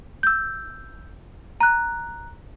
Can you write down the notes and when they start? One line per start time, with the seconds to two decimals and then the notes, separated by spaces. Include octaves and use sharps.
0.23 E6 G6
1.60 A#5 F#6